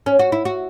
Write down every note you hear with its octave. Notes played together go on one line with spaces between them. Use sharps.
C#4
F#4
E4
F#4